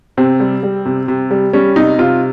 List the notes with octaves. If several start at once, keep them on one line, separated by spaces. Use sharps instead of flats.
C3 C4
G3
G3
C3
C3
G3
G3 C#4
C3 D#4
C3 F4